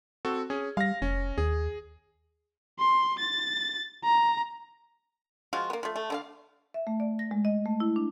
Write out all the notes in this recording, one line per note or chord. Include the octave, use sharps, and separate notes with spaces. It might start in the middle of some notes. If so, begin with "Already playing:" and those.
C4 F#4 A4
C#4 G#4
G3 F5 A#6
F1 C#4
D#2 G#4
C6
A6
A#5
F3 G#3 F4 F#4
A#3 B3
F3 A3
A3
D3 D#4 F5
E5
A3
D5
A#6
G#3
D#5
A3
E4
D4